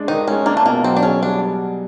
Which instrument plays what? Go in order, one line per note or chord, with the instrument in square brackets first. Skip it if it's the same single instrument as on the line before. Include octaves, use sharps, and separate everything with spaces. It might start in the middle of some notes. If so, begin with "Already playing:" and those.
Already playing: [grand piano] G#3 D4
[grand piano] D#3 [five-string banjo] D#4
[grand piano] G#3 [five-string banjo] C#4
[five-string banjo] A#3 [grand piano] D4
[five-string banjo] A3
[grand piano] B2 [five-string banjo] A#3
[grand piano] F#3 [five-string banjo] C4
[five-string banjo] D4
[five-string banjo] C#4 [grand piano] G#4
[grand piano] G3 [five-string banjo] D4